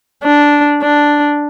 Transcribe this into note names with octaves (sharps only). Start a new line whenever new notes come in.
D4
D4